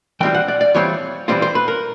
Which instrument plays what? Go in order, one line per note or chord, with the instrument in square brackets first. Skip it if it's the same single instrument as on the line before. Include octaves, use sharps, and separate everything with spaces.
[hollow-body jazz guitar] E3 G3 C4 F4 G5
F#5
D5
D5
E3 G3 C4 F4 C#5
E3 G3 C4 F4 C5
C5
B4
A#4